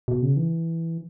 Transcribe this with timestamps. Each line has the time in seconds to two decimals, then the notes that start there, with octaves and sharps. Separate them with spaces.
0.08 B2
0.22 C#3
0.37 E3